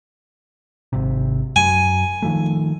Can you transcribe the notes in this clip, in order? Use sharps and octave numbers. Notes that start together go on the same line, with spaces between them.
G#1 C3
F#2 G#5
D#3 F3 A3